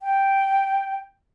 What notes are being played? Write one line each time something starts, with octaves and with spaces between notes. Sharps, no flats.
G5